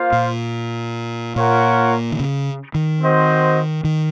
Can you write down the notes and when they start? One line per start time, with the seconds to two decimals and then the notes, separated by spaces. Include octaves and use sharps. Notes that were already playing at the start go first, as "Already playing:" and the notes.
Already playing: A#3 F4 C5 F5
0.13 A#2
1.36 A#2 F4 A#4 C#5 F#5
2.12 D#3
2.20 C#3
2.75 D#3
3.02 C4 F#4 C5 D#5
3.84 D#3